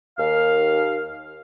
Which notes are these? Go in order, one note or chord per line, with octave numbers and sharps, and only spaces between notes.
D#2 F5